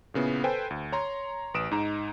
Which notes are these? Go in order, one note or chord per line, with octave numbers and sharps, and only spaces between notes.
A#2 C#3 B3 E4
A4 B4 C5 G5 G#5
D2
C#5 A#5 C6
A1 B4 D#6 D7 E7
G#2 D#4 A#5